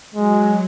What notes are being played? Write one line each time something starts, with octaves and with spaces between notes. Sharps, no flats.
F#3 G#3